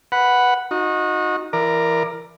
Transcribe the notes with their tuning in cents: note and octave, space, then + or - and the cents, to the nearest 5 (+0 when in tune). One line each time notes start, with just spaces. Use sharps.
B4 +0 F#5 +0 B5 +0
D#4 +0 F#4 -30
E3 +25 A#4 +0 D5 +20